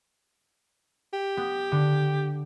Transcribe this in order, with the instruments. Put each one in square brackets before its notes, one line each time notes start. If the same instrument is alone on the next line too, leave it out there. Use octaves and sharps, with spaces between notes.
[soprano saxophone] G4
[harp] B3
D3